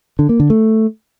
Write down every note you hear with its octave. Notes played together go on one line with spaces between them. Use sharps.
D3
A#3
D3
A3